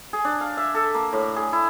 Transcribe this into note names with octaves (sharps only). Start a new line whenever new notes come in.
G#4
D4
F5
E5
A4
A#3
A2
G#4
E4